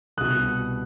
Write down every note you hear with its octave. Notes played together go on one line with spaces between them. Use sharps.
C2 B2 D#6 F#6